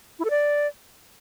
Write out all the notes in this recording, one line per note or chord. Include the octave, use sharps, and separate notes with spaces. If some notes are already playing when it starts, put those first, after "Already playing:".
E4
A4
D5